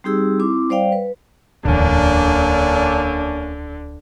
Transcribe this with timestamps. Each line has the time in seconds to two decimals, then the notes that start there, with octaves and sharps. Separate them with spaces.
0.04 G3 C4 D#4 G4 G#4 E6
0.40 C4 E4 D6
0.69 G3 C5 D5 F5 G5
0.92 B4
1.65 D1 E2 D3 A#3 C#4 D4